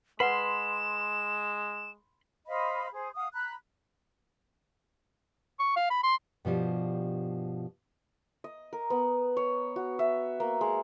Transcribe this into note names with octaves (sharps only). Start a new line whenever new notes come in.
G#3 B4 F#5 B5 C6 E7
C5 D#5 F5 B5
G#4 C5
F5 F#5 D#6
A#5 B5 F#6
C#6
F5
B5
C6
G2 B2 F3 G3
D#5
A#4
B3
C#5
F#4
E5
A#3
G#3